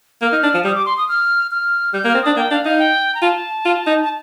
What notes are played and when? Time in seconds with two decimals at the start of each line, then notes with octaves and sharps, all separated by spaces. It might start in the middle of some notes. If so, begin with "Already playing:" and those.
0.22 A#3 F6
0.32 D#4
0.43 D4
0.54 F3
0.65 G3 D#6
0.75 D6
0.86 C6
0.97 D#6
1.08 F6
1.51 F6
1.93 G3 G6
2.04 A#3
2.08 F6
2.15 C4
2.22 D4 D#6
2.36 A#3 G5
2.51 D4 F5
2.65 D#4 F5
2.79 G5
3.14 A#5
3.22 F4 A5
3.66 F4
3.87 D#4
4.03 A5